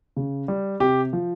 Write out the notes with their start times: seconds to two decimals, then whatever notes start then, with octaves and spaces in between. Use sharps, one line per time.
0.16 C#3
0.48 G3
0.80 C3 G4
1.13 F3